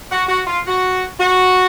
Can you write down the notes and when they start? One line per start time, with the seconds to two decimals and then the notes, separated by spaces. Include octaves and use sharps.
0.12 F#4
0.29 F#4
0.47 F4
0.66 F#4
1.20 F#4